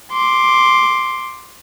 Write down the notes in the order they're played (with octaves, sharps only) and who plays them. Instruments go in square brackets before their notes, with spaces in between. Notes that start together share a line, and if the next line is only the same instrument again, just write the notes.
[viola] C6 D6